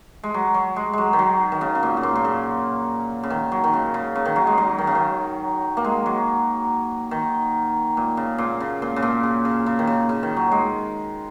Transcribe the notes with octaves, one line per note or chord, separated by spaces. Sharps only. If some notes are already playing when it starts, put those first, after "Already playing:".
G#3
F#3
F#3
G#3
F#3 G#3
D#3
F#3
D#3
C#3
C#3
A#2
C#3
A#2
A#2
C#3
C#3
D#3
F#3
D#3
C#3
C#3
C#3
D#3
F#3
G#3
F#3
D#3
C#3
D#3
A#3
G#3
F#3
D#3
A#2
C#3
A#2
C#3
A#2
C#3
A#2
C#3
C#3
C#3
D#3
C#3
C#3
D#3
F#3
G#3